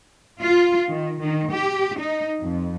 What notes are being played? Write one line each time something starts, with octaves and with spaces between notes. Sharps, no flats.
F4
D#3
D#3
G4
D#4
F2